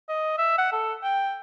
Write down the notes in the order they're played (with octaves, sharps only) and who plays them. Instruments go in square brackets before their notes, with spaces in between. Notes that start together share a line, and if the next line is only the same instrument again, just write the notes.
[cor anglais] D#5
E5
F#5
A4
G5